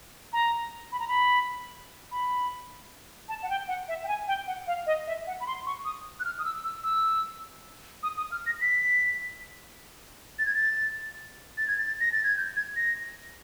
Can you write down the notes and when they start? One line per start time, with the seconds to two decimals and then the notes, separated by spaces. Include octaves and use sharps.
0.33 A#5
0.92 B5
1.00 A#5
1.08 B5
2.11 B5
3.29 A5
3.43 F#5
3.50 G5
3.68 F#5
3.88 E5
4.04 G5
4.08 G#5
4.28 G5
4.47 F#5
4.67 F5
4.86 D#5
5.07 E5
5.27 F#5
5.40 B5
5.47 C6
5.66 C#6
5.85 D#6
6.20 F#6
6.25 F6
6.39 D#6
6.45 E6
6.64 E6
6.84 E6
8.03 D#6
8.17 D#6
8.31 F6
8.46 A#6
8.61 B6
10.39 A6
10.46 G#6
10.54 A6
11.58 A6
11.67 G#6
11.78 A6
12.00 A#6
12.12 A6
12.24 G#6
12.37 G6
12.56 G#6
12.76 A#6